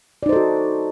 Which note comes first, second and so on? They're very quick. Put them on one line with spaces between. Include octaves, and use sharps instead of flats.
D5 D#4 C5 A4 F#4